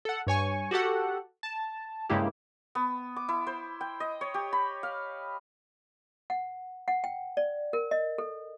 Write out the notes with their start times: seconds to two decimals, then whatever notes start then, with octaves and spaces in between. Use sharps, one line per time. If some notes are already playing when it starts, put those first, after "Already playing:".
0.05 A4 F#5
0.27 G2 C#5 G#5 C#6
0.71 F#4 G4 A4 F#5
1.43 A5
2.10 G2 C#3 G#3 A#3 E4 G4
2.75 B3
3.16 D6
3.29 E4
3.47 C5
3.81 G5
4.00 D#5
4.21 C#5
4.34 G4
4.53 B5
4.83 F5
6.30 F#5
6.88 F#5
7.04 G5
7.37 D5
7.73 A#4
7.91 D#5
8.18 A4